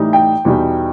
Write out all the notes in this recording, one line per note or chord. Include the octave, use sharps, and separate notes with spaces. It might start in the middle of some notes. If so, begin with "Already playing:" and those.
Already playing: A2 E3 G3 D#4
G5
E2 B2 G3 D#4